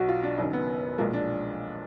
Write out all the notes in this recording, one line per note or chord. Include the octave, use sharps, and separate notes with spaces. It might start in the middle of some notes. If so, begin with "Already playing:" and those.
Already playing: B1 B2 F#3 F#4
F4
D4
F#1 F#2 D#3 D#4
B3
B1 A#2 F3 G#3 A#3
D4